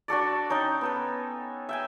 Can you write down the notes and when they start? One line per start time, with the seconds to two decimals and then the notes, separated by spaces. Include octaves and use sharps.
0.08 D4 F#4 A4 D5
0.50 C#4 D#4 C#5 G5
0.81 B3 A4 B4
1.69 E5 G5 G#5